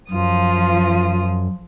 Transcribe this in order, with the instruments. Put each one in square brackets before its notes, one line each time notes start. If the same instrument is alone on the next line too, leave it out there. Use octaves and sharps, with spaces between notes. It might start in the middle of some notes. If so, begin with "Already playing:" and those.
[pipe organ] F#2 [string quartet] F3 F4 D#6